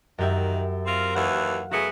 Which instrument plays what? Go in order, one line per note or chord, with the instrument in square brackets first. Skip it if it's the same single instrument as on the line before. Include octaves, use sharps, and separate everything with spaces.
[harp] F#2 G4 E5 [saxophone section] D#3
[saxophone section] C4 F4 A#4
[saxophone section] D#2 E3 [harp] F5 F#5
[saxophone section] F#3 A3 B3 [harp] F#4 G#4